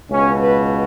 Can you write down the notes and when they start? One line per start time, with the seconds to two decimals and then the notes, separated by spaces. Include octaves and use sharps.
0.10 C#2 B2 C#4
0.39 B4